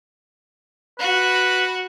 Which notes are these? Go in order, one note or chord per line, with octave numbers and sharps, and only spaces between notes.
F#4 B4